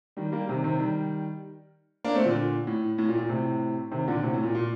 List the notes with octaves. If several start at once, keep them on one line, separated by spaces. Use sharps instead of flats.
D#3 G3
G3 A#3
C3 D#3
C3 D#3
D#3 G3
A#3 D4
A3 C4
A#2 D3
A2
A2
A#2
A#2
A2 C3
C3 D#3
A#2 D3
A2 C3
A2
A#2
A#2